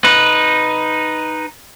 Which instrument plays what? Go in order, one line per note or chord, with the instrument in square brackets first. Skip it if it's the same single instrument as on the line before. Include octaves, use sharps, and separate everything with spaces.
[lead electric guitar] D#4 B4